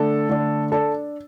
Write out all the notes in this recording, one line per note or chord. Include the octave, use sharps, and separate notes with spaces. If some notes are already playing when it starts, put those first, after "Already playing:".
Already playing: D3 A3 D4 A4
D3 A3 D4
D4 A4